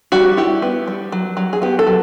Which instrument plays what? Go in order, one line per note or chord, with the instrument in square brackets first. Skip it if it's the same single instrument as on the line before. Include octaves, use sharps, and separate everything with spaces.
[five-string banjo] G3 F#4
E4 G4
B3
G3
F#3
F#3
G#4
B3 G4
A4
F#3